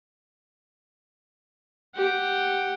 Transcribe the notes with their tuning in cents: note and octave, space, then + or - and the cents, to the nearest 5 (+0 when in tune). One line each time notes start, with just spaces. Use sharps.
G4 +0 F#5 +0